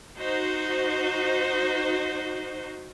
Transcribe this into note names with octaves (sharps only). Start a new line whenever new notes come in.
D#4 F#4 C5